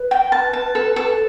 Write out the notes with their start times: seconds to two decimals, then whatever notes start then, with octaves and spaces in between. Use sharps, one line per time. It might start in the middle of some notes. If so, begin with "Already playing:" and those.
Already playing: B4
0.11 G5
0.32 A5
0.53 A5
0.75 A4
0.96 A4